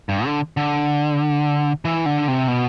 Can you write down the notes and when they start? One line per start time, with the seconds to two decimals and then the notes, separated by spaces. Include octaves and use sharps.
0.09 G2
0.25 D3
0.57 D3
1.85 E3
2.06 D3
2.28 C3
2.48 B2